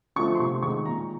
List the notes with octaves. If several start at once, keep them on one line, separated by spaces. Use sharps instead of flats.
D3 F3 A3 C#6
C6
C3 C#6
D#3 G#3 C#6
A#2 A#5